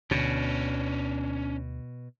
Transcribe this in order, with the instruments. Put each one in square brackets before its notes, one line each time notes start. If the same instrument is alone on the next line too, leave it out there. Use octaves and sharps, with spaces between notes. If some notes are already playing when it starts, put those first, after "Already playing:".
[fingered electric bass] D2 D3 [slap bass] B2 [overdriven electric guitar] C#4 D4